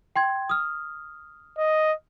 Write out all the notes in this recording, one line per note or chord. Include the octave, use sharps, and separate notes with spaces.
G5 C6 G#6
D#6 F6
D#5